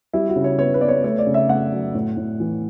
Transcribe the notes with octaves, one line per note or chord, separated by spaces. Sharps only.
G3 E4
F#4
C#3
C#5
B3 C#5
B4
B3 D5
C#5
A3 C#5
D5
C#3
E5
A3 F#5
F#3
A2
A2
E3